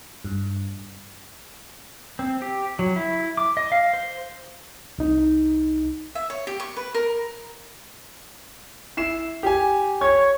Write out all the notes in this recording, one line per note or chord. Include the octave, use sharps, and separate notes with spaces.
G2
C4
G4
F#3
E4
D6
D#5
F5
C5
C2 D#4
E5
C#5
G4
C#6
B4
A#4
E4 C7 E7
G4 G#5
C#5 G#6